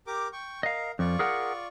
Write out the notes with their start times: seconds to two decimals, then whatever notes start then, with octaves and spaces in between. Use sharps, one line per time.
0.07 G4 A#4 D6
0.33 G5 C#6
0.63 A#4 D#5 F5
0.99 F2 F4 D5 C#6
1.19 G#4 A#4 F#5